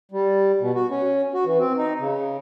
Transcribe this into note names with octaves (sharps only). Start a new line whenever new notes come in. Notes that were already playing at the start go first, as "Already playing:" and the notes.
G3
B2
F#4
C#4
F#4
E3
C4
D#4
C#3